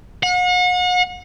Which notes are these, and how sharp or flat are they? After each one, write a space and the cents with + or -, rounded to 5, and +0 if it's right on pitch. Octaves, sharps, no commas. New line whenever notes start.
F#5 -40